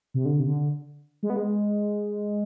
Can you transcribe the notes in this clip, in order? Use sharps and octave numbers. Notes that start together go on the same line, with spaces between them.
C3
D3
C3
D3
G#3
B3
G#3